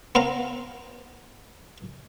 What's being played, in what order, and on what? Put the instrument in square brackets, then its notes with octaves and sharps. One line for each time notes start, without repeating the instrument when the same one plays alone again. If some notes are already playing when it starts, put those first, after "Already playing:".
[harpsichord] B3 C4 F5 A#5